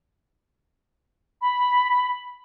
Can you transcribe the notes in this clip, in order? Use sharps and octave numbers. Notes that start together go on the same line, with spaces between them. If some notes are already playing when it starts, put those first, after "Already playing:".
B5